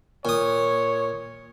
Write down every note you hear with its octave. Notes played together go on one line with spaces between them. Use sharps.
A#2 C#5 D#6